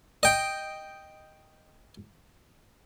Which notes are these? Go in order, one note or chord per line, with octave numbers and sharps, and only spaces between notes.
D#5 G5